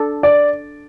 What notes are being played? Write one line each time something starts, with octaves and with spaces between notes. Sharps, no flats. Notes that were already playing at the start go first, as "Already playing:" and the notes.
Already playing: D4 A4
D5